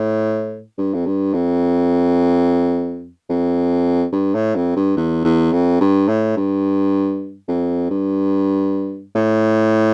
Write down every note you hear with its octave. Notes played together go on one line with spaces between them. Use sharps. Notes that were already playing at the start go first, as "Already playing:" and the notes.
Already playing: A2
G2
F2
G2
F2
F2
G2
A2
F2
G2
E2
E2
F2
G2
A2
G2
F2
G2
A2